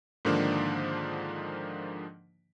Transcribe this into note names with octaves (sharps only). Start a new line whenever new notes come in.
G#2 D3 D#3 F3 A#3 D4